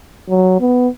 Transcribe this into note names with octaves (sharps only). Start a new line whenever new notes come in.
F#3
B3